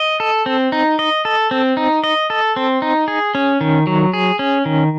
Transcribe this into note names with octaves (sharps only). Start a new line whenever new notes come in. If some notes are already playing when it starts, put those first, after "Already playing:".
Already playing: D#5
A4
C4
D#4
D#5
A4
C4
D#4
D#5
A4
C4
D#4
G#4
C#4
D#3
F#3
G#4
C#4
D#3